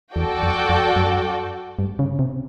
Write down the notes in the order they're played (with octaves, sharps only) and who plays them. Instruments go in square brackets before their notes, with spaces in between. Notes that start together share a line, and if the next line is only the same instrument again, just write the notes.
[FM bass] E2 [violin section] F#4 A4 D5 G5
[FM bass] F2
F2
F#2
G2
C#3
C3